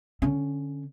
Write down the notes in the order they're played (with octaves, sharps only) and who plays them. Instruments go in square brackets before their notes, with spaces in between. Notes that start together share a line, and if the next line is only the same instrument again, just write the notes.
[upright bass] D3 C#4